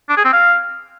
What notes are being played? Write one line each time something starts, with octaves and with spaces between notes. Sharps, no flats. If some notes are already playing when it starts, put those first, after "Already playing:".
D4
G#4
C4
F5